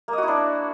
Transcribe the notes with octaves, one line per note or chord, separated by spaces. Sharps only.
A#3
D#5
F#4
E4
D4